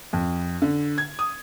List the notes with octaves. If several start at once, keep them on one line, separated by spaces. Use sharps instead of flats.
F2
D3
G#6
D#6